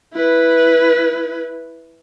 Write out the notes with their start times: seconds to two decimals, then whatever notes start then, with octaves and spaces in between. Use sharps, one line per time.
0.14 E4 B4